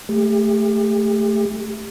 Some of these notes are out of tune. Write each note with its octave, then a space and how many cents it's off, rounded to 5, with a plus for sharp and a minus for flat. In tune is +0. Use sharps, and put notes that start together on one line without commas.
A3 +0 G4 +35